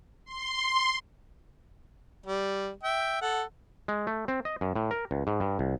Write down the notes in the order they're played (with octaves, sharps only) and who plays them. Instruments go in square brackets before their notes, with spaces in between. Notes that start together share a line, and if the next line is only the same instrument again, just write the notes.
[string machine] C6
[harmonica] G3
E5 G5
A4 F#5
[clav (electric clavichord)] G#3
A3
C4
D#5
F#2
A2
A#4
C#2
G#2
G2
C2